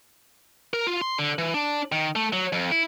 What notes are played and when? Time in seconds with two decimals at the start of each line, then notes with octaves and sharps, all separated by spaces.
0.74 A#4
0.87 F4
1.01 C6
1.18 D3
1.38 E3
1.54 D4
1.92 D#3
2.16 A3
2.33 F#3
2.52 F2
2.71 E4